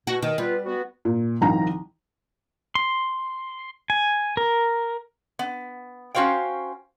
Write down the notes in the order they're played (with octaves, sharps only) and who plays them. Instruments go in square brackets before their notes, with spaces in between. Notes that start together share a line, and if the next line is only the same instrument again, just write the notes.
[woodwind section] B2 [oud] F#4
[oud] D#3
[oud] G3 [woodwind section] B3 F4 B4
[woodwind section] B3 F#4
[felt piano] A#2
C2 D#3 F3 A#5
[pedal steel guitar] C6
G#5
A#4
[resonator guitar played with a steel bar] B3
C#4 F#4 C5 F5 G5